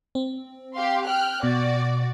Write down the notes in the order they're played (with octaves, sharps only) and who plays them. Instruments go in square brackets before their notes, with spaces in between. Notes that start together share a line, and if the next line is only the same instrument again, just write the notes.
[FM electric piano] C4
[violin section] G4 F5 C6
G5 F6 F#6
[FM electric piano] B2 [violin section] F#4 D5